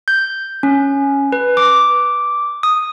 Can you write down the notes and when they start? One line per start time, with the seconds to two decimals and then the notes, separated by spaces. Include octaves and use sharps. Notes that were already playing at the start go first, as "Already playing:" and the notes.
0.08 G6
0.63 C#4
1.32 B4
1.57 D6
2.63 D#6